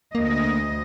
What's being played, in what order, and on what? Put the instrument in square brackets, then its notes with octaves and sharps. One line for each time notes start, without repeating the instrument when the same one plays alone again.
[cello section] D2 D#5 [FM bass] A#3